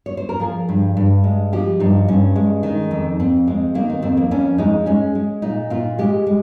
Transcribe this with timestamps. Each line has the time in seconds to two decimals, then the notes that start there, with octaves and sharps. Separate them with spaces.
0.06 C#5
0.17 C5
0.29 A#4
0.40 F3 G#4
0.69 G2
0.97 G2
1.24 G#3
1.53 F3 G4
1.80 G2 D#4
2.08 G2 C#4
2.36 G#3
2.63 D#3
2.91 F2
3.20 F2 C4
3.47 G#3 C4
3.75 D#3 A#3
3.90 C4
4.02 F2 C4
4.17 A#3
4.31 F2 C#4
4.58 G#3 D#4
4.86 G#3 C#4
5.15 G#3
5.42 A#2 D#4
5.70 A#2 F4
5.98 G#3 G4
6.27 G#3